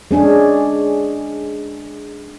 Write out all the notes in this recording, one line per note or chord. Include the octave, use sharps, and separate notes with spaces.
G#3 C#4 D4 G#4